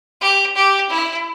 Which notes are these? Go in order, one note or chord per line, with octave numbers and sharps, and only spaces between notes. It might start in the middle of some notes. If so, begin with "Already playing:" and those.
G4
G4
E4